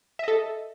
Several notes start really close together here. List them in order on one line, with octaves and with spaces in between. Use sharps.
E5 D#5 A4